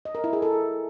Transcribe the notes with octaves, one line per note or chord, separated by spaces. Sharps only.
D#5
A#4
E4
G#4
A4